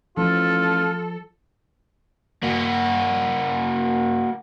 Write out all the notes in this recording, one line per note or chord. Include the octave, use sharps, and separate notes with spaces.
A1 F3 F4 A4
A#3 F#4